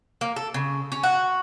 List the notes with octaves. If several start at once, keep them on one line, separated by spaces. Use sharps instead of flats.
A#3
A4
C#3
C#4
F#4